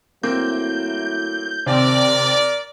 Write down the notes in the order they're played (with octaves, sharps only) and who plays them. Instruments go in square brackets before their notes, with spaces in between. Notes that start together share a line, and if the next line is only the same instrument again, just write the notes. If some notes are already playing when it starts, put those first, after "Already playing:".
[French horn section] F#3 A3 E4 [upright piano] A#3 C4 [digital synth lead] G6
[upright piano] D#2 C4 [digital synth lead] C3 [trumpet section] A#4 D5